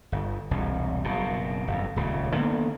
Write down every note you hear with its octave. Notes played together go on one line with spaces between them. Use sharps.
G1
E1 C2
F#1 B2
G1 F2
D#1 C#2 C#3
D3 D#3 A#3 B3